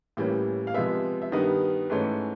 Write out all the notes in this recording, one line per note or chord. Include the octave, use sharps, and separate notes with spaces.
A2 E3 G3 A#3 C#4
F5
C3 F3 G#3 B3 E5
E5
G2 D#3 G3 B3 D#5
G#2 E3 A3 C#4